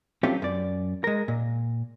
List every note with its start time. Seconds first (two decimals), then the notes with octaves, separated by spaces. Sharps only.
0.23 F#3 A3 C4 C#4 F4 G4
0.42 F#2 D5
1.04 G#3 A#4
1.28 A#2